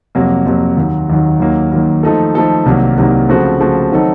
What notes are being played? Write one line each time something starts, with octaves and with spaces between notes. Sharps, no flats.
F2 C3 F#3 A#3
F2 C3 F#3 A#3
D#2 D#3 F#3
D#2 D#3 F#3
D#2 D#3 F#3 A#3
D#2 D#3 F#3 A#3
F3 A3 D#4 A4
F3 A3 D#4 A4
C2 C3 D#3 F#3 A#3
C2 C3 D#3 F#3 A#3
C#3 F3 A3 C4 F#4
C#3 F3 A3 C4 F#4
D#3 F#3 C4 D#4 A4